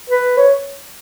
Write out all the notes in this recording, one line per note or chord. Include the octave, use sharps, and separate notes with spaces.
B4
C#5